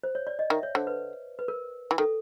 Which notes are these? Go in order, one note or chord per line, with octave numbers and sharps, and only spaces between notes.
C5
C#5
D5
D#5
D#3 E5
C#5
D3 C5
B4
B4
A#4
E3
D#3 A4